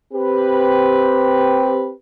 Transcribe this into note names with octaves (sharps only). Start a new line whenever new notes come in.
C4 G4 B4